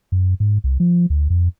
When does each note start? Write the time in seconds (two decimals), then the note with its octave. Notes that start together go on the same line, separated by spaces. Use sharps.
0.12 F#2
0.40 G#2
0.64 C2
0.80 F3
1.10 D2
1.30 F2